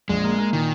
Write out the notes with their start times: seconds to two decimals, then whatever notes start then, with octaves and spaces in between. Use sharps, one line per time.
0.09 A#1 G#3
0.24 A#3
0.38 A#3
0.53 A#2 D#3